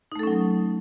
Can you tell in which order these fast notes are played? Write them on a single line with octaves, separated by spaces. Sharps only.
D#4 A3 A4 C#4 F#3